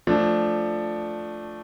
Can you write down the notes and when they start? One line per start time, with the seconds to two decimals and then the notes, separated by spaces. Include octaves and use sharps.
0.07 F3 A3 D4